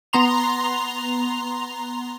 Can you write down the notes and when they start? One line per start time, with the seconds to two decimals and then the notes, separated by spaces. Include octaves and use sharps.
0.13 B3 A#5 C6 F7